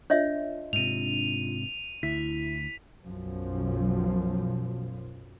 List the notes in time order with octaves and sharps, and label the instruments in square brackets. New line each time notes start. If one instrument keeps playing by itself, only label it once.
[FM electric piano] D4 F4 [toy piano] C#5 D#5 E5
[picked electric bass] G#2 C3 [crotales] D#7 F7
[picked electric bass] D2 [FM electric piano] E4 [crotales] B6
[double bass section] B1 F#2 F3